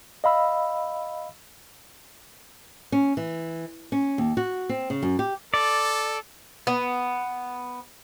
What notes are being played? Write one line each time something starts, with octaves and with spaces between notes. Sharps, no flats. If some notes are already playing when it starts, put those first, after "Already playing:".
D#5 F5 B5 E6
C#4
E3
C#4
D#2
F#4
C4
C#3
F#2
G4
A4 D5
B3